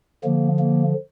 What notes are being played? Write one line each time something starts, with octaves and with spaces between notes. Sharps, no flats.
D3 F3 A#3
A#3